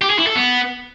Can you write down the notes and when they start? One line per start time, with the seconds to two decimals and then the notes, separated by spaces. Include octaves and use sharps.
0.02 G4
0.10 G#4
0.19 E4
0.27 A4
0.35 B3